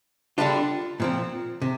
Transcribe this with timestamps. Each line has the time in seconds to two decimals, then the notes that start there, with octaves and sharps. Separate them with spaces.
0.38 D3 G3 D4 F4
1.00 A#2 F3 C4
1.62 C3